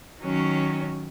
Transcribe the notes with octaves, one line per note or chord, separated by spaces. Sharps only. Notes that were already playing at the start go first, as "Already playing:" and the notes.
D#3 F#3 C#4